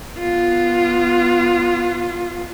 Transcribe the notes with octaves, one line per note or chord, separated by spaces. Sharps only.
B3 F4